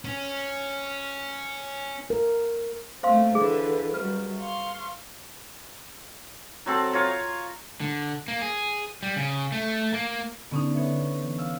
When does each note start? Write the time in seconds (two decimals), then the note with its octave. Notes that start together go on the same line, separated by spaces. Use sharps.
0.05 C#4
2.10 A#4
3.03 A3 A#3 C4 C5 F5 C6
3.35 D3 E3 G#4 B4
3.94 F#2 G3 B4
4.40 F5 C6 C#6
6.66 F#3 C4 A4
6.93 F4 C#5 A#5
7.81 D3
8.28 A#3
8.41 G#4
9.03 G3
9.16 C#3
9.52 A3
9.94 A#3
10.51 D3 B3 C#4 D#4
10.74 B3 C#5 E5
11.22 E3
11.38 F5 E6